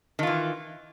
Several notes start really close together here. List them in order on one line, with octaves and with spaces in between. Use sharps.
D#3 F4 E3